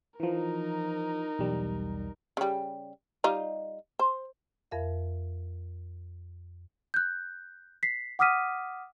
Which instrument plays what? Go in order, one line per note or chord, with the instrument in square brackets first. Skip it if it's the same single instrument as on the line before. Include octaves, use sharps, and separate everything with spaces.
[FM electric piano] E3 F3 [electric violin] D#4 A#4
[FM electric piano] B1 E2 G3
[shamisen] C#3 G3
G3 D#4 F4
C5
[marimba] F2 A#4 E5 F5
[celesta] F#6 G6
B6 C7
F#5 D6 D#6 F6 B6 D#7